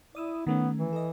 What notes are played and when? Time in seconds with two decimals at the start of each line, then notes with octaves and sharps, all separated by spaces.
0.15 E4 D5 D#6 E6
0.47 D#3 A3 B3 C#4
0.78 E3
0.93 A4 D#5